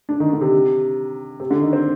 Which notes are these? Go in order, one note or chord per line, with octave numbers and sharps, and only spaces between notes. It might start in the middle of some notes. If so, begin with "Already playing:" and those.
D4
D#3
D3
C3
C3
D3
D#3
C4